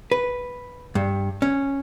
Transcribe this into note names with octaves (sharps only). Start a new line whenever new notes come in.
B4
G2
C#4